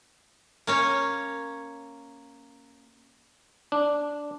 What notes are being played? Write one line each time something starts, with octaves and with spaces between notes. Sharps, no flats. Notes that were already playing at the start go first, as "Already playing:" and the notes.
A#3 C#4 C#5
D4